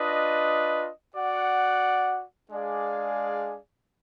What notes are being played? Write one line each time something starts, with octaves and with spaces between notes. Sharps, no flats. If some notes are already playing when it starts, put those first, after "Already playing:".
Already playing: D4 F4 B4 D#5
F#4 D5 F#5
G#3 D4 G#4 D5 F5